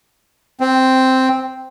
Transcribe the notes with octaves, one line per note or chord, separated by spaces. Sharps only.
C4